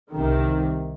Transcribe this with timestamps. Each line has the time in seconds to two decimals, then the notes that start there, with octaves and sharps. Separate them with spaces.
0.12 C2 C3 D#3